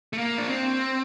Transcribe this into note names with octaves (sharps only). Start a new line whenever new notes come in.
A3
A#3
D4
C4